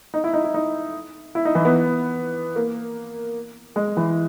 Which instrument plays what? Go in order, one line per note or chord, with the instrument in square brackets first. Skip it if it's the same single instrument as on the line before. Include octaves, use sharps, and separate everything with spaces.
[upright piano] D#4
E4
D#4
E4
D#4
E4
D#4
E3
B3
A#3
G#3
E3